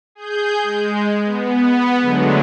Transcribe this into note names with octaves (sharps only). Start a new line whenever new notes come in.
G#4 G6
G#3
B3
D3 F#3 G#3 A3